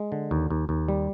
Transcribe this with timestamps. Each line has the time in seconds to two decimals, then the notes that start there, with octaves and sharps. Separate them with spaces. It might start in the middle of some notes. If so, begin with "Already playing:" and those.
Already playing: G#3
0.12 D3
0.31 D#2
0.50 D#2
0.69 D#2
0.88 G3